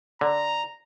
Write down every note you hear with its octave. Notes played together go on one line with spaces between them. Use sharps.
D3 A#5